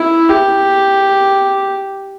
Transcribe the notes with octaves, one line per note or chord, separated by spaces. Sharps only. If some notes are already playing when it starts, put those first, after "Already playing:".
Already playing: E4
G4